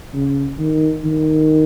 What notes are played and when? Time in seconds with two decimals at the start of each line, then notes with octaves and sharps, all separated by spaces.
0.14 C#3
0.59 D#3
1.05 D#3